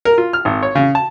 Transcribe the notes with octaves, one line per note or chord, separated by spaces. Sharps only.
A#4
F4
F6
G#1
C#5
C#3
A5